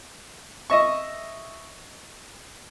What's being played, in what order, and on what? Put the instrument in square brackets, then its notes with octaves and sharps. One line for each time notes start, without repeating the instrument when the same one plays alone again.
[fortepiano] D#5 E5 C#6